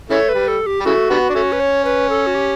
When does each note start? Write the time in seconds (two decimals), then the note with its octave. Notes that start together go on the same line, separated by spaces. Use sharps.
0.10 C#3 E3 A3 C#5
0.29 B4
0.35 G3
0.48 A4
0.66 G4
0.80 G3
0.85 C#3 E3 A3 F#4
1.10 D3 G3 B3
1.30 D4
1.35 A3 C#4
1.52 B4
1.60 C#5
1.85 B4
2.10 A4
2.27 F#4
2.35 G4